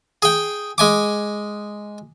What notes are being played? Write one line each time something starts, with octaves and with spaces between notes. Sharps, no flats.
G#4 G5
G#3 G#5 D6